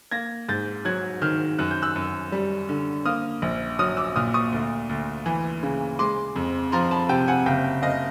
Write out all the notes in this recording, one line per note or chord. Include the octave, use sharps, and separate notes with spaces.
A#3 G#6 A#6
G#2 G6 A6
F#3 F#6 G#6
D#3 F6 G6
F#2 F#6
G6
E6 F#6
F#2
G3
D3
A#3 D#6 F6
A#1
F#3 D#6 F6
D6 E6
A#2 D#6 F6
C#6 D#6
D2
D2
E3
C#3
G#3 C6 D6
F2
F3 A#5 C6
A5 B5
C3 G5 A5
F#5 G#5
F#1 F5 G5
F#1 D#5 F5